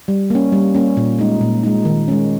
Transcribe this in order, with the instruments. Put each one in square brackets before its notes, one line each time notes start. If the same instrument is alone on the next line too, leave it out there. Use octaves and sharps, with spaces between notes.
[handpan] G3
A#3 C#4
G3
A#3 C#4
A#2
G#3 D#4
A#2
G#3 D#4
D#3
G#3 C#4